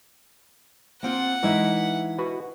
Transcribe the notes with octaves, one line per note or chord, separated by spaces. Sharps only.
A#3 C4 F4 F#5
E3 G#3 D#4 E4 E5
F#4 B4